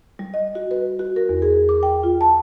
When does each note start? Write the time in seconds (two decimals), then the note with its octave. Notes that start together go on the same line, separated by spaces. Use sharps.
0.19 G3
0.34 D#5
0.55 F#4
0.71 B4
0.99 F#4
1.16 A#4
1.29 E2
1.42 G#4
1.69 D6
1.83 G5
2.03 F4
2.21 A5